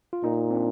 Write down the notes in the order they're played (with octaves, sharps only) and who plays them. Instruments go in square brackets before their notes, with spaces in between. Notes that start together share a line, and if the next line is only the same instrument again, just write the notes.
[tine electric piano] F4
[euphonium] A#2 [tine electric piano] D#4
[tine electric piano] C4
D4